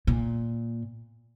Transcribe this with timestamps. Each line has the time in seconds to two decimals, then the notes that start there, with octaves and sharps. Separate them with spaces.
0.07 A#2